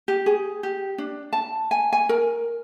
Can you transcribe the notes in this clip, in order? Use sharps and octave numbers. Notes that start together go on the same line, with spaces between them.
G4
G#4
G4
D4
A5
G#5
G#5
A#4